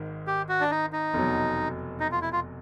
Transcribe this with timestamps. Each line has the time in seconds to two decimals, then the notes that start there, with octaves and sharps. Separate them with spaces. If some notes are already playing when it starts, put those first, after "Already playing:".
Already playing: G#1 G#2 D#3
0.27 G4
0.49 F#4
0.60 D4
0.71 D#4
0.93 D#4
1.14 F1 E2 B2 F#3
2.00 D#4
2.12 F4
2.22 E4
2.33 F4